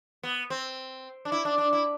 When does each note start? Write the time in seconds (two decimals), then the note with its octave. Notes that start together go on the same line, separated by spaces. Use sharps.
0.23 B3
0.50 C4
1.25 D4
1.32 E4
1.45 D4
1.58 D4
1.73 E4